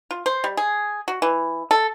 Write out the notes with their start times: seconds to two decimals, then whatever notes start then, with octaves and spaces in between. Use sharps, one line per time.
0.11 F4
0.26 C5
0.44 G3
0.57 G#4
1.08 F#4
1.22 E3
1.71 A4